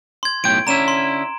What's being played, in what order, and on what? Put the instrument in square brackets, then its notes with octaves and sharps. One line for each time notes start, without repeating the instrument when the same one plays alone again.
[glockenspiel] C6 G#6
[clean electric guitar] B1 A2 G5 [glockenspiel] D7
[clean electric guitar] D3 C#4 E4 [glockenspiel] A#5 E7
[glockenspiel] C6